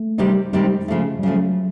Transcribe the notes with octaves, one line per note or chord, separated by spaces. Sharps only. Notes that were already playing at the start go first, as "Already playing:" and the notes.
Already playing: A3
C3 D#3 G3 C4 D#4
C3 D#3 G3 G#3 C4 D#4
C#3 F3 A3
G3
C#3 F3 F#3 A3